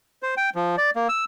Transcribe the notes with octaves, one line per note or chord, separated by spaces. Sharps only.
C5
G5
F3
D5
A#3
E6